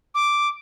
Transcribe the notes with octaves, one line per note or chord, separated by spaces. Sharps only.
D6